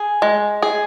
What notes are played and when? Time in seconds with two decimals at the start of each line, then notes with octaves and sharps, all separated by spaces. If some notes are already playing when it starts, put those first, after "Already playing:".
Already playing: G#4
0.22 G#3
0.62 G#4